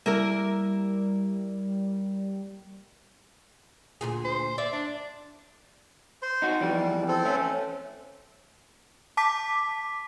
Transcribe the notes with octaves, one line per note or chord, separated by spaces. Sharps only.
G3 A#3 E4 A#4
D2 A#2 G#4
C5
D5 E5
D4
C5 C6
D#4 F#4
F2 E3 G3
C4 A4
A3 C#4
A5 D6 B6